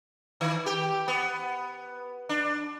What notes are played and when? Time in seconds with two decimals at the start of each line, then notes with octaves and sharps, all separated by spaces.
0.41 D#3
0.66 G4
1.08 B3
2.29 D4